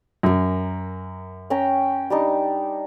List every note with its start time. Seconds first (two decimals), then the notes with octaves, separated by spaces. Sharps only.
0.23 F#2 A#4 G#5
1.50 C#4 G5 A#5
2.10 G3 D4 D#4